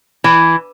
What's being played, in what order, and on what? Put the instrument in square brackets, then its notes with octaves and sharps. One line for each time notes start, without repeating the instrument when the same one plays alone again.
[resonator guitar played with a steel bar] E3